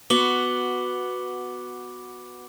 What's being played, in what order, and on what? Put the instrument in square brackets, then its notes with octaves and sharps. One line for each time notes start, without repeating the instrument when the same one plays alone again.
[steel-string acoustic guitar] B3 F#4 [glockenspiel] D6 F#7 G7